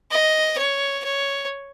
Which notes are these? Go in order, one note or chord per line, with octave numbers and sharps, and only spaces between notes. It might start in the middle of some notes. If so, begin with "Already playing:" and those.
D#5
C#5
C#5